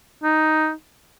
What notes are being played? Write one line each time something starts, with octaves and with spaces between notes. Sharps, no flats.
D#4